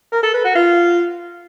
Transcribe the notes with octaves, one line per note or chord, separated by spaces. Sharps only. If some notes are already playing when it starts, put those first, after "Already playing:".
A#4
A4
B4
F#4
F4